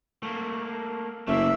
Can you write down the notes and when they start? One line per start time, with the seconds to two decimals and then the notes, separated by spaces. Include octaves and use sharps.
0.23 A3 A#3
1.27 F#1 A3 A#3 E5